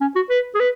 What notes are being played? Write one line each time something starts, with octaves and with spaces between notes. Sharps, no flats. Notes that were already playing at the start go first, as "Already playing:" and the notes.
C#4
F#4
B4
G#4
B4